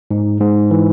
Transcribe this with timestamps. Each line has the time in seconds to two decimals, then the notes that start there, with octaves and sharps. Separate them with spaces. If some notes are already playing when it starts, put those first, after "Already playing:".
0.11 G#2
0.41 G#2
0.71 E3